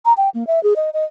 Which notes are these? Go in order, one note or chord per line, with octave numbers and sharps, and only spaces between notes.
A#5
G5
A#3
E5
G#4
D#5
D#5